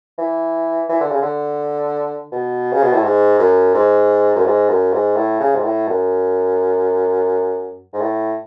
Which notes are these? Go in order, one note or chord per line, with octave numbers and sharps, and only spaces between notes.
E3
E3
D3
C#3
D3
B2
C#3
B2
A2
G#2
F#2
G#2
F#2
G#2
F#2
G#2
A2
C#3
G#2
A2
F#2
G#2
A2